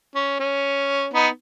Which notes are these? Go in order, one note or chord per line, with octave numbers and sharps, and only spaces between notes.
C#4
C#4
B3 D#4